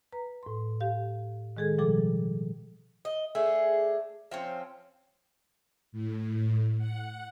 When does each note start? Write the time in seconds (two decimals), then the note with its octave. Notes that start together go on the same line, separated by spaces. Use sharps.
0.13 B4 A#5
0.43 A2 C6
0.80 G4 F5
1.57 D#3 G#3 G#4 A4 G#6
1.78 B2 F3 G3 A4 D6
3.05 D#5
3.35 A3 D4 G#4
4.31 F3 C4 C#4
5.92 A2
6.78 F#5